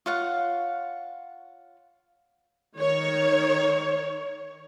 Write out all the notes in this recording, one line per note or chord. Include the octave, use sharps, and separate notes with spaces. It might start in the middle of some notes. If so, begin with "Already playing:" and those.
F4 C#5 F5 F#5
D#3 C#5